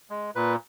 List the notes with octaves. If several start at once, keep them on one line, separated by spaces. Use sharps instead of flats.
G#3
A#2 B4